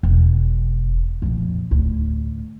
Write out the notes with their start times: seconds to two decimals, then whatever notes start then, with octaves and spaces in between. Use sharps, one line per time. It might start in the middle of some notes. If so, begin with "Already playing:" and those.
0.03 E1
1.22 F2 A#2
1.71 D2 A2